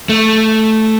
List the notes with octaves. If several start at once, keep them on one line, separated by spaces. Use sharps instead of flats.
A3